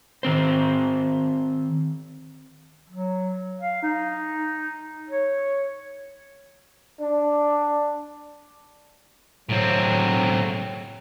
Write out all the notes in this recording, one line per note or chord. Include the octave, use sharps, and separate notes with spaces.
D#3 C4 C5
F#3
F5
D#4
C#5
D4
A2 F#3 C4